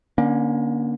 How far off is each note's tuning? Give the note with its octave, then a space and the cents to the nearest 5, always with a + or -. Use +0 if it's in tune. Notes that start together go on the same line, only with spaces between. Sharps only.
D3 +0 A#3 +30 C#4 +0